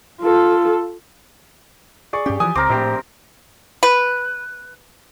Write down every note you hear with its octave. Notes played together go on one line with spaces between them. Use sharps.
F4 A4
G#4 D5 C#6
G2 C#4 G4
E3 F3 G#5 D#6
C#2 C4 A#4 D6
A#1 A2 G4 C5
B4